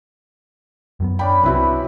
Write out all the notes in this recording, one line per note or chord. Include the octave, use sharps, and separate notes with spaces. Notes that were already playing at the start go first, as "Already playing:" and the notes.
F#2 F#3 B3
C#4 D4 G5 B5
C2 C4 E4 F#4 B4